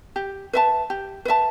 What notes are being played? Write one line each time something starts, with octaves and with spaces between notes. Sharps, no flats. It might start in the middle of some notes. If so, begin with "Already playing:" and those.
G4
B4 E5 A5
G4
B4 E5 A5